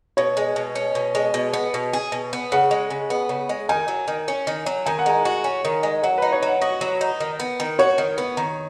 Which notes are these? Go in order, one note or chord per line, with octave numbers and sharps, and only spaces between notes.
B2 C#5
G#3
B2
C#4
B2
G#3
B2
B3
B2
G#4
B2
B3
C#3 F#5
G#3
C#3
B3
C#3
G#3
D#3 G#5
F#3
D#3
C#4
D#3
F#3
D#3 G#5
F#5
G#3 G#5
F#4
C#4
D#3
G#3
F#3 F#5
D#4 B4
C#5
F#3 F#5
F#4 D#5
F#3
D#4
D#3
B3
D#3
F#4 C#5
D#3
B3
D#3